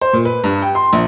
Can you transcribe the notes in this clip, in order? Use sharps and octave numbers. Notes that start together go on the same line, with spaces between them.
C5
A#2
B4
G2
G5
C6
A#1